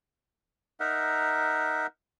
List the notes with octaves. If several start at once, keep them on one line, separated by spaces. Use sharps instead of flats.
D#4 A#4 E5 F#5